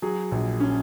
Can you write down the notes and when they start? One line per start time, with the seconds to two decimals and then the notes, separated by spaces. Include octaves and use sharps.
0.02 F#3 G#4
0.32 A#1
0.60 C#4